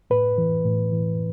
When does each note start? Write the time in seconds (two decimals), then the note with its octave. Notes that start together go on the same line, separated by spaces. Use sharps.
0.10 A2 B4
0.38 E3
0.65 A2
0.92 E3